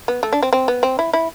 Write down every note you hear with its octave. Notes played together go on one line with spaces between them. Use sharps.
B3
A3
D4
C4
C4
B3
C4
E4
E4